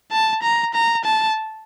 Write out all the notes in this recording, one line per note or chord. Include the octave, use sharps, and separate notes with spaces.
A5
A#5
A#5
A5